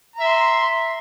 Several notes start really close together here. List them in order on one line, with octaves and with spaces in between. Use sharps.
A#5 E5 C6